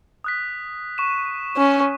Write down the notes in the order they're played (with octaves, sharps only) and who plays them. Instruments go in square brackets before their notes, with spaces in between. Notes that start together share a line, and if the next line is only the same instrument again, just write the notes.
[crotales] D#6 F#6 B6
C#6 D#7 E7
[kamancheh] C#4